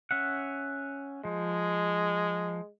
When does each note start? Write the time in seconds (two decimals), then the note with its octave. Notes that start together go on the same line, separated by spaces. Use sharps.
0.11 C#4 E5 F#5
1.25 F3 G#3